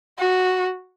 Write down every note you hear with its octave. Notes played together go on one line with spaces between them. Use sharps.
F#4